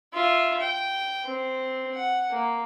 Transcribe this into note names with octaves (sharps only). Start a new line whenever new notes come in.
F4 E5
G5
C4
F#5
A#3